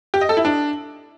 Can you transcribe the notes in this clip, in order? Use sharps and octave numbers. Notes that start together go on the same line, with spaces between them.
G4
D#5
A4
E4
D4